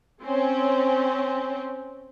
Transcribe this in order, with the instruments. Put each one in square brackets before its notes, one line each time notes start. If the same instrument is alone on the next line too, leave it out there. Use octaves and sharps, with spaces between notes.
[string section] C4 C#4